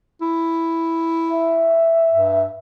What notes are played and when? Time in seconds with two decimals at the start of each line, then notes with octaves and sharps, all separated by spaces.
0.21 E4
1.31 E5
2.12 G2